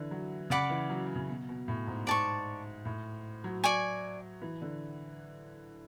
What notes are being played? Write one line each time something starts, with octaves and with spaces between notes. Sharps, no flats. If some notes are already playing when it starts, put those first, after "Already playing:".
Already playing: D3 E3
F#3
C#3 D5 F#5 B5 D6
E3
F#3
C#3
B2
B2
A2
G#2
G#2 D5 A5 C#6
A2
F#3
D5 G#5 C#6
E3
D3